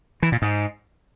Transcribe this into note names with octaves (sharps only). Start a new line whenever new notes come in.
E3
A#2
G#2